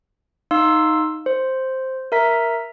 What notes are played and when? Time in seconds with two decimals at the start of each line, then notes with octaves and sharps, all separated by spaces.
0.51 D#4 F5 C6 E6
1.26 C5
2.12 A#4 E5 A#5 B6